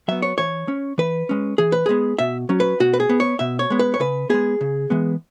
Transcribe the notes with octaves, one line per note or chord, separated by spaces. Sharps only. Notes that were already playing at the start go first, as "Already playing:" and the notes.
F#3 B3 E5
C#5
E3 C#5
C#4
E3 B4
G#3 C#4
E3 G#4
B4
G#3 B3 G#4
B2 E5
F#3 C#4
B4
B2 F#4
B4
G#4
B3
C#5
B2 E5
C#5
G#3 B3
B4
C#5
C#3 B4
G#3 B3 G#4
C#3
E3 G#3 B3